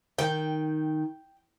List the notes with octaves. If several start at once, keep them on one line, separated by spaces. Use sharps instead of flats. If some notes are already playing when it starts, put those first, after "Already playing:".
D#3 G5